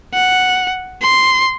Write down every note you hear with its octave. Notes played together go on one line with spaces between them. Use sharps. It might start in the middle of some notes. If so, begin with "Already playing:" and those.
F#5
C6